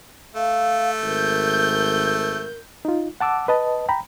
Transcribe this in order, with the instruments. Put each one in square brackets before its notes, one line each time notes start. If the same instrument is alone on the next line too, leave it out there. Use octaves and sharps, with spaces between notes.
[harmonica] A3 [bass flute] F5
[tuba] G#1 [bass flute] A#4 [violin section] G6
[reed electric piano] D#4 F4
F#5 A5 D6 E6
B4 D#5 A5
G5 A#5 B5